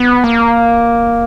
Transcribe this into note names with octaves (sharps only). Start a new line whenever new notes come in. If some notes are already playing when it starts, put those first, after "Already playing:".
Already playing: B3
A#3